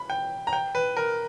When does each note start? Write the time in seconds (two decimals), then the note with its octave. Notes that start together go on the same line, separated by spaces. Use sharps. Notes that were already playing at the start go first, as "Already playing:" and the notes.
Already playing: B5
0.10 G5
0.47 A#5
0.53 G5
0.75 B4
0.97 A#4